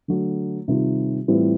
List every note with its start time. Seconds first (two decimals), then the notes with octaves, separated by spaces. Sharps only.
0.08 D3 F#3 A3
0.68 C3 D#3 G3 C4 F4
1.28 A2 E3 G3 C4 F4